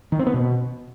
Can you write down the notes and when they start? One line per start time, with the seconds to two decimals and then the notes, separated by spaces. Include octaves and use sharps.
0.12 D#3
0.19 C4
0.27 B3
0.34 B2